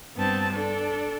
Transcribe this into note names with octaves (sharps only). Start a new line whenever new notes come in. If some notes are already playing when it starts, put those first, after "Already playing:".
G2 B3 C4 A5
D4 A4